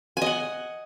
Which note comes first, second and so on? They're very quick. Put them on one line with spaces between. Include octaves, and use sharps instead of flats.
G#5 D#5 F#5